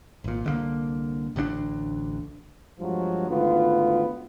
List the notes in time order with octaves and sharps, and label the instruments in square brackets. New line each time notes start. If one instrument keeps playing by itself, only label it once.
[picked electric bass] G#1 A#2
C2 D3 E3 A#3
A1 D2 B3 D4
[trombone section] G2 F3 F#3 G#3
G#1 D2 B3 F4